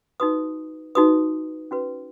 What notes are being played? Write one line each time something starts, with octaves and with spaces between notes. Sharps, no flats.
D#4 F#4 B4 D#6
D#4 F#4 B4 D#6
C#4 F#4 B4